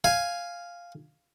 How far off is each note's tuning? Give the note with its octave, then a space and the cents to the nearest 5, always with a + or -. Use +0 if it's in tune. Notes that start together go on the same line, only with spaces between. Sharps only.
F5 +0 G#5 +0